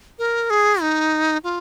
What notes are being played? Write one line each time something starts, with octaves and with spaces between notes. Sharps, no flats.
A#4
G#4
D#4
F4